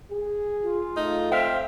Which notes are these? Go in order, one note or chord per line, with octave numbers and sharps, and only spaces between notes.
G#4
F4
A3 D#4
C4 E5 F5